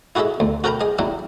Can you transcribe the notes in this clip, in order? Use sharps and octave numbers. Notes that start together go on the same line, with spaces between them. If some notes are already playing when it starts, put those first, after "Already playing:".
E4 F#4 G#4 A4 D#5 E5
D2
F#4 A4 A#4 G5 A#5 B5
G#4 D#5
F#3 G3 D4 E4